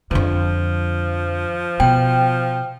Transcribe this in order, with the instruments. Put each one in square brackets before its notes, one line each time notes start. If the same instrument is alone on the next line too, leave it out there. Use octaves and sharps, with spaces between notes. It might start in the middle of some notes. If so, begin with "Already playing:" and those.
[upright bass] F2 D3 [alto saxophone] F3
[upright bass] B2 [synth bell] G5